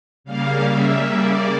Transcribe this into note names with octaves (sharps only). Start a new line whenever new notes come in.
C#3 G3 A#3 F5
E5
D5